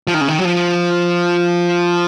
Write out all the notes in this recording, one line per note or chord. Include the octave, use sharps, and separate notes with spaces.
F3
D#3
C#3
D#3
F#3
F3